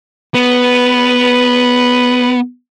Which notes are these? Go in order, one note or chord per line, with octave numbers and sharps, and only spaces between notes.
B3 B4